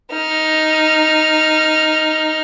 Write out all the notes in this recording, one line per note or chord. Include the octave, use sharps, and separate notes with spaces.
D#4 F6